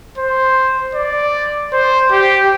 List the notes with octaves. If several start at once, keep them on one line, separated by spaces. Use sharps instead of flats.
C5
D5
C5
G4